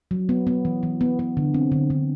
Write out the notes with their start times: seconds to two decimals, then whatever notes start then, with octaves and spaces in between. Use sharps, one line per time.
0.11 F#3
0.29 B3
0.47 B3
0.65 E3
0.83 E3
1.01 B3
1.19 B3
1.37 D3
1.54 C4
1.72 D3
1.90 D3